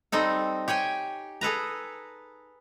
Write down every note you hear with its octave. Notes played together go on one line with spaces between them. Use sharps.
G3 C4 D#4 A4
G4 C#5 G5 G#5
G#4 A4 B4 A#5